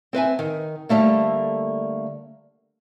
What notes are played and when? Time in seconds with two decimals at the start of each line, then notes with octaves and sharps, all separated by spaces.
0.13 C4 B4 E5 G#5
0.39 D#3
0.89 D3 G3 A3 A#3